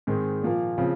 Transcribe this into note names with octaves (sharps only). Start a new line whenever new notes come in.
G#2 D#3 G#3 C4
A#2 F3 A#3
C#3 F3 C4